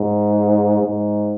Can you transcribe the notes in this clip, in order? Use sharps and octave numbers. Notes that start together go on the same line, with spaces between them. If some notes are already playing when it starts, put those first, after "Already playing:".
Already playing: G#2
G#2